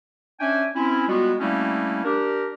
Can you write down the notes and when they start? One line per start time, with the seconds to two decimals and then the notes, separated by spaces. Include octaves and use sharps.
0.40 C#4 D4 E5 G5 G#5
0.75 C4 C#4 E4
1.08 G3 G#3 B3 F4 F#4
1.40 G3 A3 A#3 C4 C#4 E4
2.05 D4 G4 A#4